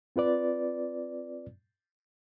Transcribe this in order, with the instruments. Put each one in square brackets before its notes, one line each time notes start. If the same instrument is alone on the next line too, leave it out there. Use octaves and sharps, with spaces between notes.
[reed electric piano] C4 F4 B4 D5